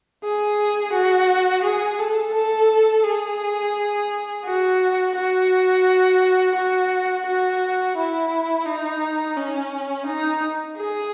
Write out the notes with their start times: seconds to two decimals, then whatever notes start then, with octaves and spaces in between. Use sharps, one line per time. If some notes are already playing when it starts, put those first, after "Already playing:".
0.23 G#4
0.93 F#4
1.63 G#4
1.99 A4
2.34 A4
3.04 G#4
4.45 F#4
5.15 F#4
6.55 F#4
7.26 F#4
7.97 E4
8.66 D#4
9.37 C#4
10.06 D#4
10.77 G#4